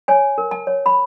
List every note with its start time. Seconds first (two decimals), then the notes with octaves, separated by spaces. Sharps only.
0.08 C#5 G#5
0.38 A#4
0.51 A5
0.67 C#5
0.86 B5